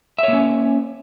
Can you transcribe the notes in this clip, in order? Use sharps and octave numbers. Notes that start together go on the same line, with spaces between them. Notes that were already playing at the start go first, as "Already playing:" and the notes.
A#3 C#4 C#5 E5